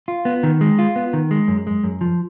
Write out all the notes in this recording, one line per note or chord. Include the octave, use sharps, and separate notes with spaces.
F4
B3
D#3
G#3
F4
B3
D#3
G#3
F#2
G#3
F#2
F3